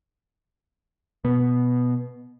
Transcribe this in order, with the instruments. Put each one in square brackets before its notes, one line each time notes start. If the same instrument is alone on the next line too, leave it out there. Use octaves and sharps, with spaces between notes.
[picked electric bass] B2 B3